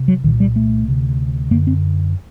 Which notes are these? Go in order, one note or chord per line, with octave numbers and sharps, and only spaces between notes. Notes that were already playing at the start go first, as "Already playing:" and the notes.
Already playing: C3
F#3
C2 A#2 D#3
G3
A3
D2 C3
F#2 D3 A#3
C4